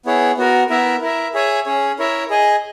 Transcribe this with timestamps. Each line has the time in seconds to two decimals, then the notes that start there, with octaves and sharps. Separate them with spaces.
0.06 B3 E4 G#4 C#5
0.37 B3 F#4 A#4
0.70 B3 E4 A#4 E5
1.02 E4 A#4 E5
1.34 G#4 C#5 E5 G#5
1.66 C#4 G#4 C#5
1.99 E4 A#4 C#5 E5
2.30 G#4 D#5 G#5